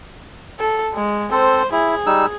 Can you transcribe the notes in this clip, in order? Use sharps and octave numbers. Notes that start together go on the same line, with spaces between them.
A4
G#3
C4 A4 C5
E4 G#4
G3 D#4 E6